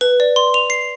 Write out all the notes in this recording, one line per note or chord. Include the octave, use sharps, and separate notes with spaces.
B4
D5
C6
F7
C7